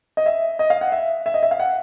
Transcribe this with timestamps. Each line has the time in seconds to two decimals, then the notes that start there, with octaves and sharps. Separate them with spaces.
0.17 D#5
0.26 E5
0.59 D#5
0.70 F5
0.81 F#5
0.92 E5
1.26 E5
1.34 D#5
1.43 E5
1.51 F5
1.60 F#5